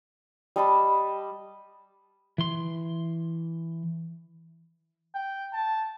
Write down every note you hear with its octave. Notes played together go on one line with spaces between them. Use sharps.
G3 D#5 A5 B5
E3 C6
G5
A5